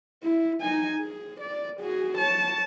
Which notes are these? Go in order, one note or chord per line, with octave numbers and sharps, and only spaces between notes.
E4
D#4 G#5
G#4
D5
F#4 G#4
C#5 A5